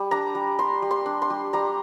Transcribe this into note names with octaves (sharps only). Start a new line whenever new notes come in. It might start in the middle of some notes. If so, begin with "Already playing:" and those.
Already playing: G3
D4 A#5
G3
G3 C6
G3
C6
D4
C6
G3
G3 A#5